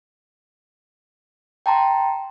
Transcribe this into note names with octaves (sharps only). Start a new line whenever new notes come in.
G5 A5 A#5 C6